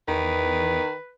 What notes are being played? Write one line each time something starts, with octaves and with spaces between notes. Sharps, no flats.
E2 D#3 B4